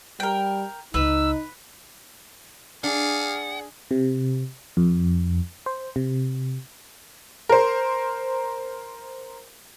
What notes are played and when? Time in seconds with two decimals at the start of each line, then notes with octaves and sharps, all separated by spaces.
0.20 G3 A#4 G5
0.94 C#2 D#4 B4 E6
2.84 D4 G#4 F5 F#5
3.91 C3
4.77 F2
5.66 C5
5.96 C3
7.49 A#4 C5